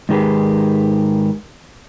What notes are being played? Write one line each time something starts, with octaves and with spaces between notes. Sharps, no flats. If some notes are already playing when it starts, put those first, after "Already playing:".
G#2 D#3 G4 G#4 B4